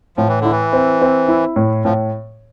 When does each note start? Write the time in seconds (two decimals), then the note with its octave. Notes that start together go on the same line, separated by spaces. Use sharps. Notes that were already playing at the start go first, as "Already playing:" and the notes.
0.17 A2 F3
0.28 E3
0.41 D3 E4
0.51 E3
0.73 C4
1.02 C4
1.28 E4
1.56 A2
1.85 A2 F3